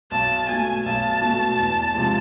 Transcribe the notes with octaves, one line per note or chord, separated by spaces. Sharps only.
B1 A5
B2 A3 G#5
B1 A5
B2 A3
E2
C3 F3 G#3